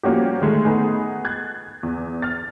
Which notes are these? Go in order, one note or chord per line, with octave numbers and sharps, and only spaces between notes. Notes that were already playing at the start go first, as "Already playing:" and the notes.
F3 G3 A#3 C#4 F#4 G4
D#3 G#3 A3
A3 B3 D#4 G#4
F#6 G#6 A6
E2
F6 A6